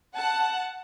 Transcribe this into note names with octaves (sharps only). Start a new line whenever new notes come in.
F#5 A5